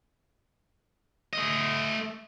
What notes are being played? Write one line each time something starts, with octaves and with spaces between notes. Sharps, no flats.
A3 D#5